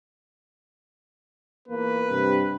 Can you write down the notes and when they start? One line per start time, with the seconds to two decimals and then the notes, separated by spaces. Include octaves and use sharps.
1.68 E2 A#2 A#3 B4
2.08 G2 C3